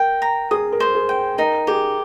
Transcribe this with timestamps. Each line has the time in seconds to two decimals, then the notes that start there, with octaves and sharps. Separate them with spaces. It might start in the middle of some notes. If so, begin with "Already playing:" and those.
Already playing: A#4 G5
0.22 A#5
0.51 G#4 D#6
0.72 A#4
0.80 C5
0.95 G#4
1.09 G5
1.38 D#4 A#4
1.67 G4 G#4